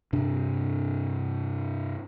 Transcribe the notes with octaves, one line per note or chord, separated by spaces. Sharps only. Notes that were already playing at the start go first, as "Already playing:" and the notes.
G2 C3 D4